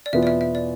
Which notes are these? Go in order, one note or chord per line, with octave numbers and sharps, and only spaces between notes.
D5
E2 B2 B3 F4 E5
D5
E5
E5
D5